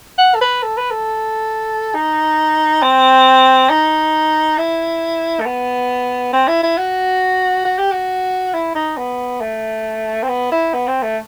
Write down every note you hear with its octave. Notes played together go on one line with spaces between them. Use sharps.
F#5
A4
B4
A4
B4
A4
D#4
C4
D#4
E4
A3
B3
C4
E4
E4
F#4
F#4
G4
F#4
E4
D#4
B3
A3
C4
B3
E4
B3
C4
A3